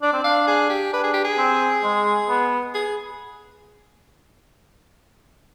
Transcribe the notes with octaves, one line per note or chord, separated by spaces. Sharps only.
D4 D5
C4
D4 F5
G#4
G4
D4 B4
G#4
G4
G#4
C4
G#3
B3
G#4